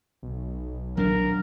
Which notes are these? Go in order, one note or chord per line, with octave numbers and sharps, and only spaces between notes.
B1
D#1 F#3 D4 A#4